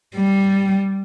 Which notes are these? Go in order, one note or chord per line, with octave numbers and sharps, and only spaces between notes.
G3